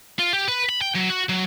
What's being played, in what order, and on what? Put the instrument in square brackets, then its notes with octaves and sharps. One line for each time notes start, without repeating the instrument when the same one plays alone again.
[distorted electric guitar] F4
G4
B4
B5
G5
F#3
F#4
F#3